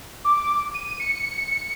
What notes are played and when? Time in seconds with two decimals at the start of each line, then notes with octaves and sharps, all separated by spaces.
0.25 D6
0.74 D#7
1.00 C#7